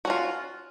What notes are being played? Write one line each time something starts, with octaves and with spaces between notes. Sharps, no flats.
C#4 F4 F#4